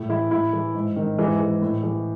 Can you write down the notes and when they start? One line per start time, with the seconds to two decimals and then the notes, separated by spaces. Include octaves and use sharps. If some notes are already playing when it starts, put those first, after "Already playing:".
Already playing: A2
0.09 E3 E4
0.31 A2 E4
0.53 E3
0.74 G#2
0.96 D#3
1.18 G#2 E3
1.40 E3
1.62 A2
1.83 E3